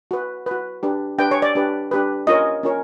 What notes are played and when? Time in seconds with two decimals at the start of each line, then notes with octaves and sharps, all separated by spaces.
0.11 F#4 B4
0.46 F#4 B4
0.83 D4 G4 B4
1.18 D4 G4 B4 G5
1.31 C#5
1.42 D5
1.55 D4 G4 B4
1.91 D4 G4 B4
2.27 C#4 F4 A#4 C#5 D#5
2.63 C#4 F4 A#4 C#5